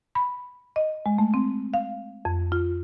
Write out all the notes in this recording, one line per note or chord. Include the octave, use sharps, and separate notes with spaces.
B5
D#5
G#3
A3
C4
F5
F2
F4